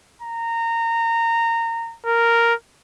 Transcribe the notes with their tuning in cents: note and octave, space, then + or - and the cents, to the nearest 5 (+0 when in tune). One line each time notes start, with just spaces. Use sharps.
A#5 -20
A#4 -5